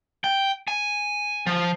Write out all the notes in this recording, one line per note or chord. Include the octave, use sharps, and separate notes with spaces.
G5
G#5
F3